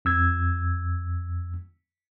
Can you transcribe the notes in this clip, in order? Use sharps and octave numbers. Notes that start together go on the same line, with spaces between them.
F2 E6 G#6